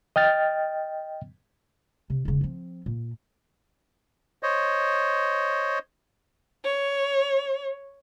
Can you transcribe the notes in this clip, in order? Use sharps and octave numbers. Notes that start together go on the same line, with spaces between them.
D#5 G5 F6 A6
C3
E1 C#3
F3 C4
A#2
C5 C#5 D#5
C#5